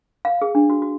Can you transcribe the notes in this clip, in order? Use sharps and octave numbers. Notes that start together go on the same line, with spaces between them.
F5
G#4
D4
F#4
F#4